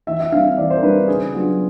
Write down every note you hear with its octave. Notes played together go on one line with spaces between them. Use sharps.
E3 E5
E5
G3 C4 D#4 F5
E5
E3 D5
C5
A#4
G3 C4 D#4 B4
C#3 G#4
F#3 B3 D4 F4